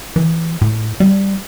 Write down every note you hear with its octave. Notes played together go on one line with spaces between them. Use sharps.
E3
A2
G3